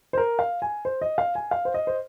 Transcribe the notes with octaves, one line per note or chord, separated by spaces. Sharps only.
C5
A#4
F5
G#5
C5
D#5
F5
G#5
F5
C5
D#5
C5